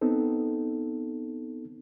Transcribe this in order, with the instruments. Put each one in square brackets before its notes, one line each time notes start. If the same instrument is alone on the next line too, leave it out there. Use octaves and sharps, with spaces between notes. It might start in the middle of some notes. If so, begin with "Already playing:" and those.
[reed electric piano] B3 C4 D#4 A4